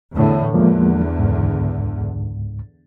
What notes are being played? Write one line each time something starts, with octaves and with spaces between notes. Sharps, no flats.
E2 A2 D3
E2 D3 F3 G#3 A#3
C#2 G#2